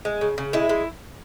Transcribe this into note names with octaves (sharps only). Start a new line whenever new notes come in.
G#3
C#3
C#3
G#3 E4
G#3